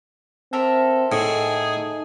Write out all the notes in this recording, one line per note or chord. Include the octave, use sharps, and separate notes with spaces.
C4 A4 A#4 E5
A2 D#4 G#4